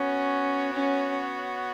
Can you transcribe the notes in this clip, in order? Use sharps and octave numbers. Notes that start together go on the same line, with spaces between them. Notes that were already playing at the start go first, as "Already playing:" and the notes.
Already playing: B3 C#4 F#4 C#5
C#4